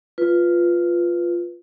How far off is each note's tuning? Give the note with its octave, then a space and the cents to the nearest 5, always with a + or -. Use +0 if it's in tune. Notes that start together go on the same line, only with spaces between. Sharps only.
F4 +0 B4 +0